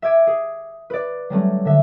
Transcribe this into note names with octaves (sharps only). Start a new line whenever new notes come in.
E5 D6 G#6 D7
G#4
B4 D5
F#3 G3 A3 C#4
D3 E5